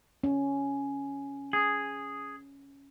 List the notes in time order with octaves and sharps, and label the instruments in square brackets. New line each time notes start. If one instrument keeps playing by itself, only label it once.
[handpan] C#4
[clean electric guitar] G#4